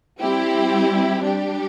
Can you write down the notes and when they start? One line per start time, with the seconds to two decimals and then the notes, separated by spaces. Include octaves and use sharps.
0.20 G3 C4 E4 G4
1.23 G3 D4 G4